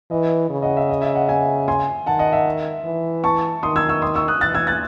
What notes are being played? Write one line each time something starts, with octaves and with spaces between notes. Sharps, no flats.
E3 D#5
C#3
D#5 F#5
E5
D#5
E5
D#5 F#5
E5 G#5
G#5 C6
D#3 F#5 A5
D#5 F#5
E5
E3
A5 C#6
D#3 C6 D#6
E6 G#6
C#6 E6
C6 D#6
C#6 E6
D#6 F#6
E3 F#6 A6
E6 G#6
F#6 A6